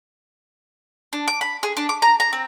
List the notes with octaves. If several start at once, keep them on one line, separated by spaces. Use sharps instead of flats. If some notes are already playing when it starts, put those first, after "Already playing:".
D4
D6
B5
G#4
D4
D6
A#5
A#5
C4